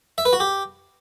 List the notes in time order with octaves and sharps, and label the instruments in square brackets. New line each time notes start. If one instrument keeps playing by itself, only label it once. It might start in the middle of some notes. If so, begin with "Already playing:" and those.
[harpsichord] E5
B4
F#4
G4